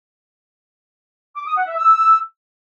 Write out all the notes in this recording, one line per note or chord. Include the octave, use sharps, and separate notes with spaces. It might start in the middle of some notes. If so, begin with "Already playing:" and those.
D6
D#6
F#5
E5
E6